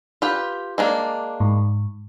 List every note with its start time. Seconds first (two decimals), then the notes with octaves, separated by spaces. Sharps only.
0.22 F4 G4 B4
0.78 G#3 A#3 D4
1.40 G#2